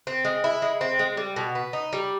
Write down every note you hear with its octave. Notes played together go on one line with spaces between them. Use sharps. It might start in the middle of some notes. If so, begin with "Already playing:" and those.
C4
G#3
E4
G#3
C4
G#3
G3
B2
B3
D#4
G3